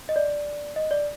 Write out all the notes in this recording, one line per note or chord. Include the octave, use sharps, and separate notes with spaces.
D#5
D5
D#5
D5